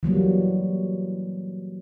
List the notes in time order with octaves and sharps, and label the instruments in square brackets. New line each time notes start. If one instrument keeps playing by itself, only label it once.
[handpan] E3 F#3 G3 A#3